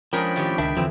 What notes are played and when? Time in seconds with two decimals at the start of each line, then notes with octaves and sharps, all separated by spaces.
0.13 F2 F3 G#3 C#4 D4 A#4 G5 B5
0.36 A2 D#3 G4
0.58 C#2 B2 D#3 D4 E5
0.77 E2 D3 E3 F3 C4